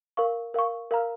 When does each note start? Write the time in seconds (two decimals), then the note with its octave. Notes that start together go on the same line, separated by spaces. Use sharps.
0.17 A#4 F5 C#6
0.54 A#4 F5 C#6
0.91 A#4 F5 A#5 F6